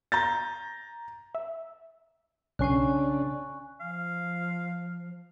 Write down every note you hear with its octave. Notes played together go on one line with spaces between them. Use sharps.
A#5 G6 A6
E5
B1 C#3 C#4 D4 G#5 C#6 F#6 C7
F3 F5